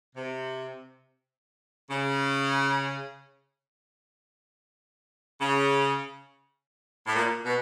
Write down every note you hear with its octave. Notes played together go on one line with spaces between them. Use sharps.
C3
C#3
C#3
A2
A#2
B2